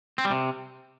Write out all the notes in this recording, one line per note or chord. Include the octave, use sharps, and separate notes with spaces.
C4
G3
C3